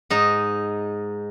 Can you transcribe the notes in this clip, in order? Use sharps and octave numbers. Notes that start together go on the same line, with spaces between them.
G#2 D#4